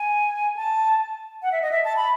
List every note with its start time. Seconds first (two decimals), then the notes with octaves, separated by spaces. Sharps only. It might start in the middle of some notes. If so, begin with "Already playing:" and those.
Already playing: G#5
0.56 A5
1.42 F#5
1.52 E5
1.62 D#5
1.71 E5
1.85 A5
1.96 B5